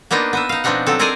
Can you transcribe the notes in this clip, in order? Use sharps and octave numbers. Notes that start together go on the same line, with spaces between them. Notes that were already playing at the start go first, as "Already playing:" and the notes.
A#3 B3 D4 D#4 F4
B3 D#5 E5
D#4 F5
B2 F3 C4 D4 D#4 F#5
F#3 C4 A4
G#4 A#4 C5 D5 D#5 G#5